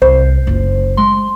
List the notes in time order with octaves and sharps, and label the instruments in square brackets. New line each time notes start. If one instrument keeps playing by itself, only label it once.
[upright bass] C2 [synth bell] C5
[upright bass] F#1 F4
[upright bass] G#3 [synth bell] C6